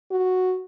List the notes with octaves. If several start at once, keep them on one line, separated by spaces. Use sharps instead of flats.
F#4